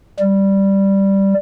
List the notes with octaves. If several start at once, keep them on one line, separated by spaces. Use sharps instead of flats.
G3